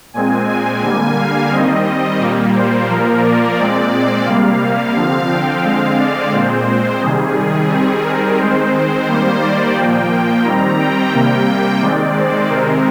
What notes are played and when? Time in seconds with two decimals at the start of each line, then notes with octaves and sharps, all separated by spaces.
0.14 A#2 G#3 C4 G#5
0.48 G#5
0.82 D3 G3 A#3
1.17 F5
1.51 D#3 G3 C4 D#5
2.19 A#2 G3 A#3
2.54 C5
2.89 A#2 F3 A#3 A#4
3.23 D5
3.57 A#2 G#3 C4 D5
4.25 C3 G3 A#3 F5
4.95 D3 F3 C4
5.29 G5
5.63 D3 G#3 C4 F5
5.97 D5
6.33 A#2 G#3 C4 C5
7.00 C3 D#3 G3 G#4
7.69 D#3 G3 C4
8.04 A#4
8.38 D#3 G#3 C4 C5
9.06 D#3 G3 A#3
9.41 D5
9.76 A#2 F3 A#3 G5
10.09 G5
10.44 D#3 G3 C4 A#5
10.79 G5
11.13 C3 G3 A#3
11.81 D#3 G#3 C4 D5
12.16 C5
12.50 C3 D#3 G#3 C4 A#4